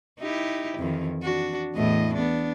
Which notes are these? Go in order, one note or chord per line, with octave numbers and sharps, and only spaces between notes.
D#4 E4 G4
F2 D#3 E3
D4 F#4
E2 A2 D#5
B3 D4